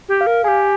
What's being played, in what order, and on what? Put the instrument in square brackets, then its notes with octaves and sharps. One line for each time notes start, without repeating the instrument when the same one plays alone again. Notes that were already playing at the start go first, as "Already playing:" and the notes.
[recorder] G4
[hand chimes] F5
[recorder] A#4
[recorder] G4 G#4 [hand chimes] G#5